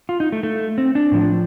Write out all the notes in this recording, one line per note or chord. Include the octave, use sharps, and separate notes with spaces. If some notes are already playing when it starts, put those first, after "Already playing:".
F4
D#4
A3
A3
C4
D4
A2 F3